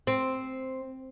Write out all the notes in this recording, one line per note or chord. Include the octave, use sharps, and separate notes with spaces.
C4